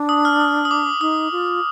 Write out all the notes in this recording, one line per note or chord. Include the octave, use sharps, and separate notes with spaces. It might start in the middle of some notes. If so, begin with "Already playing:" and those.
Already playing: D4
D#6
F6
D#6
D#6
D6
D#4 D#6
F4